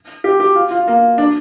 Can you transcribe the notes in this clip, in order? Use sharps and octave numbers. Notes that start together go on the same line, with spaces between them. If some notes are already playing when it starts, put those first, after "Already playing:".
G4
G4
F4
F4
A#3
D4